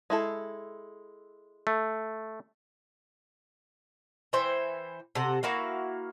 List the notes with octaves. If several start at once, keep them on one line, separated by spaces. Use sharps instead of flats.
G#3 E4 A4
A3
E3 E4 C5 G5
C3 A4 F#5
A#3 E4 F#4 F5